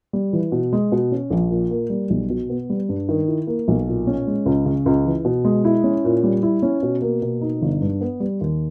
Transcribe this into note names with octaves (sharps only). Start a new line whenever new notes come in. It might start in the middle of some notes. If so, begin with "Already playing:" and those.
G3
E3
B2
G#3
B2
C#4
A#1
A#2
A#3
G3
B1
B2
B3
G3
G2
D#3
E4
A#3
B1
A#2
C#4
G#3
C#2
C#3
C#2
E3
B2
G#3
E4
C#4
A#2
G3
E4
C#4
B2
A#3
B2
D#4
G1
G2
B3
G3
D#2